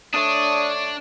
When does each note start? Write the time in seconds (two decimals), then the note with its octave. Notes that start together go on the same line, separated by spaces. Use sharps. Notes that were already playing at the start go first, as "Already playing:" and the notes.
0.14 A3 D4 C#5 D#6